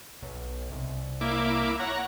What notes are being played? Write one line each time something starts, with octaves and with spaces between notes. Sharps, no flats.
B1
C2
A#3 E4 D6
C#5 F#5 A#5